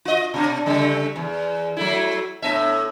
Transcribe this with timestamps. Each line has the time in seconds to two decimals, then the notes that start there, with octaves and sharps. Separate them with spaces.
0.05 F4 D#5
0.34 B2 D4
0.66 C#3 G3 A3
1.16 E2
1.77 F#3 A3 E4
2.42 A2 B3 E5